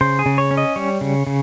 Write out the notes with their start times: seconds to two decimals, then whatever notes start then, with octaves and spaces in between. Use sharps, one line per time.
0.01 C#3 C5
0.19 G#4
0.26 C#3
0.38 C#5
0.51 C#4
0.57 D#5
0.76 G3 C#5
1.01 C#3
1.27 C#3